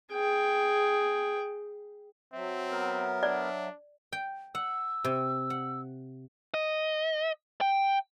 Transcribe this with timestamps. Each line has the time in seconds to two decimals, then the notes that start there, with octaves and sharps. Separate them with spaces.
0.12 G#4 G5
2.34 F#3 C4 E5
2.71 B3 A#4
3.23 D4 D5
4.12 G5
4.55 F#5 E6
5.04 C3
5.50 F#5
6.54 D#5
7.61 G5